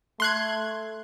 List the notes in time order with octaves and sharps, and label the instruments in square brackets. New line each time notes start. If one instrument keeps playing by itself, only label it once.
[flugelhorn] A3 [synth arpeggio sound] C6 F#6 G#6